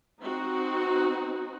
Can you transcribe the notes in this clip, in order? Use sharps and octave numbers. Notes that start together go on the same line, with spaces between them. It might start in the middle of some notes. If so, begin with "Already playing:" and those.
C4 D#4 F#4